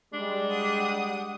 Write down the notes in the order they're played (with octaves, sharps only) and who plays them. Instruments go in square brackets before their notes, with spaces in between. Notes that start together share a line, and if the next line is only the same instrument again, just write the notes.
[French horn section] G3 G#3 [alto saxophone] D4
[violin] F#5 D#6